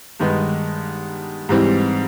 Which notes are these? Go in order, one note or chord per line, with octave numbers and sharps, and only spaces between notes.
G2 D#3 G#3 B3
G#2 E3 G3 C4